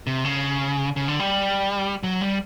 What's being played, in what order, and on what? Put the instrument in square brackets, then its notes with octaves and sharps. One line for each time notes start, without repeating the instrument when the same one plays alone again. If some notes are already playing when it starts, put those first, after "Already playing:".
[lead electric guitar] C3
C#3
C#3
D3
G3
F#3
G3